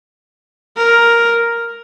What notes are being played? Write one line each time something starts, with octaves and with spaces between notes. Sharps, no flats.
A#4